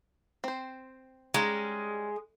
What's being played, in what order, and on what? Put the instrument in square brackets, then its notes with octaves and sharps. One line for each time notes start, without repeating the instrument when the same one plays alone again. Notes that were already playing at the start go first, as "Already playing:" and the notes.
[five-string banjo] C4 C5
[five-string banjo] G3 C#4 D#4 [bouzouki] G#3